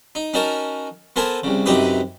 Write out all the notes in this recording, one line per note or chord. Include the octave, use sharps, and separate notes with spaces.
D#4
C#4 D#4 F#4 A#4 A5
B3 A4 A#4 C5 G#5 A5
C2 C#3
F#2 C3 D#4 G4 B4 D#6